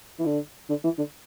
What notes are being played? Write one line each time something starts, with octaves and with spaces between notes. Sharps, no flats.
E3
D3
D3
E3
D3